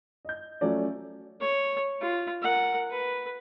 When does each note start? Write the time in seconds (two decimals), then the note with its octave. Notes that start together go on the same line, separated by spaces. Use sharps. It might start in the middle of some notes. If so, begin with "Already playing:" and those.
0.25 D#5 G6
0.61 F3 F#3 A3 C#4 D5
1.41 C#5
2.01 F4
2.43 A#4 F#5
2.91 B4